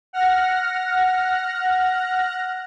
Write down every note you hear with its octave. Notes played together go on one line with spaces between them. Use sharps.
F#5 F6 A#6